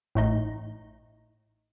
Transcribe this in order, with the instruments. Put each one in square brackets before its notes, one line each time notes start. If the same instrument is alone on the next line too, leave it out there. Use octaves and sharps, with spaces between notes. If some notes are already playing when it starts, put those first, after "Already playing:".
[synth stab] A1 A2 D#4